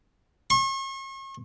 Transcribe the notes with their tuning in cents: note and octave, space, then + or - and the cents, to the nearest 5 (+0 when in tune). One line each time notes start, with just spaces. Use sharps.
C#6 -40